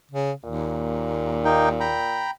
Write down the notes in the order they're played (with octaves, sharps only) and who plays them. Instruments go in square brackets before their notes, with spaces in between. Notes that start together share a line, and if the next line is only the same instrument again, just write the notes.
[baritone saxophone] C#3
[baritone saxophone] D#2 [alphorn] A#2
[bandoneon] A#3 D#4 G5
G5 A#5 B5